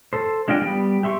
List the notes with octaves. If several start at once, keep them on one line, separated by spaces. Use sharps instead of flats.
A4 C5
G#3 D4 F4 D#5 G5
G3 B3 G5
G4 E5 C6 C#6